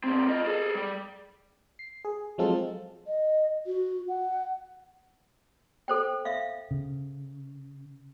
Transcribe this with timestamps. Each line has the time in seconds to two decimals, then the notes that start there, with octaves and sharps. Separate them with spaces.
0.04 A#2 C4
0.29 F4 D#5
0.45 G#4 A4
0.75 G3
1.79 C7
2.05 G#4
2.38 F3 F#3 G#3 C4 F4 A4
3.07 D#5
3.66 F#4
4.08 F#5
5.88 A4 C5 G5
6.25 E5 F5
6.71 C#3